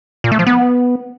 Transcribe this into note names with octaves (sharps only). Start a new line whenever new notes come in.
A#2
A3
F3
B3